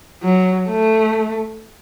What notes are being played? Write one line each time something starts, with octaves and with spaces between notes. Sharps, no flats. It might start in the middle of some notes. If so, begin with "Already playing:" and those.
F#3
A3